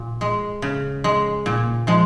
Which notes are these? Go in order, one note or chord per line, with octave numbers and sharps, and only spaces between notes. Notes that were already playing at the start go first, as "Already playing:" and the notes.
Already playing: A#2
G#3
C#3
G#3
A#2
F3 G#3